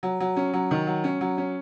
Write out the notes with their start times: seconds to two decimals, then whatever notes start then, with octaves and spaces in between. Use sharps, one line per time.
0.03 F#3
0.20 F#3
0.36 C#4
0.53 F#3
0.71 D#3
0.87 F#3
1.04 C#4
1.21 F#3
1.38 C#4